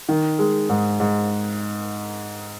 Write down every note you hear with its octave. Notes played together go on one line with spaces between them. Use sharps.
D#3
G#3
G#2
G#2